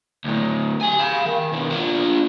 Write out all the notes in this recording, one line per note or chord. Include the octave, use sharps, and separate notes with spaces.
D2 A2
G4 G#5
F5 B5
D#3
B2 D4
D4 F4